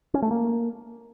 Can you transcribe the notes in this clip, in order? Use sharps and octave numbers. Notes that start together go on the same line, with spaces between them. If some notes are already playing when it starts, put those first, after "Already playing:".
C#4
A3
A#3